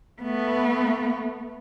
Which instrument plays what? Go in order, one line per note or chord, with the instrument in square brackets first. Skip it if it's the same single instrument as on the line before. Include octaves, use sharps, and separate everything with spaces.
[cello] A3 B3